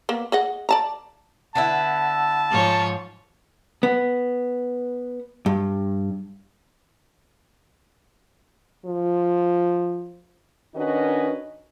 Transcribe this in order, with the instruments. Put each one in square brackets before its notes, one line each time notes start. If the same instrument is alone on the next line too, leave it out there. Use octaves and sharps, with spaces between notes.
[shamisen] A#3 B3
G#4 D#5 F#5
D5 A5 A#5
[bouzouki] D3 B3 E4 [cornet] A5
[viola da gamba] G#2 F3 C#5
[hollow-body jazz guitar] B3
G2
[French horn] F3
[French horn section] D#3 C#4 D4 F#4 B4 D#5